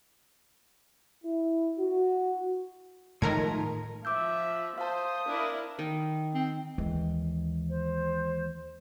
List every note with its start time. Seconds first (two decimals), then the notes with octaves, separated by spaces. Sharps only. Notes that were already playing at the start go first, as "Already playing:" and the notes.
1.24 E4
1.78 F#4
3.22 A2 D#3 F3 G#3 A3 A#4 A#5 G#6
4.05 F3 E5 D6 E6 G6
4.78 C5 F5 A5 D#6
5.26 D4 E4 A#4
5.79 D#3
6.34 C4
6.78 D#2 E3 G#3
7.69 C5